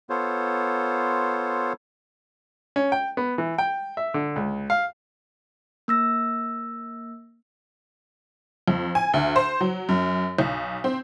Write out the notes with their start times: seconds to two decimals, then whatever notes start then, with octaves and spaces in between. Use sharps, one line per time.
0.10 B3 F4 A4 C5 C#5
2.76 C#4
2.92 G5
3.17 B3
3.38 E3
3.58 G5
3.97 E5
4.14 D3
4.36 C#2
4.70 F5
5.88 A#3 E6 A#6
8.68 F2
8.95 G#5
9.14 D2
9.36 C5
9.61 F#3
9.89 F#2
10.39 B1
10.84 C4